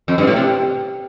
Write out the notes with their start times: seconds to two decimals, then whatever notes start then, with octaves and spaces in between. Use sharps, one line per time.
0.08 F2
0.18 G2
0.27 A2
0.36 C3